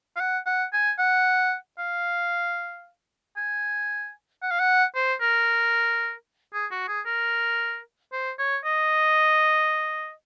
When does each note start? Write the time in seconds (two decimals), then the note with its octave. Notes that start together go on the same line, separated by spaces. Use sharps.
0.16 F5
0.20 F#5
0.46 F#5
0.73 G#5
0.99 F#5
1.79 F5
3.37 G#5
4.43 F#5
4.51 F5
4.60 F#5
4.95 C5
5.21 A#4
6.54 G#4
6.71 F#4
6.88 G#4
7.06 A#4
8.13 C5
8.39 C#5
8.65 D#5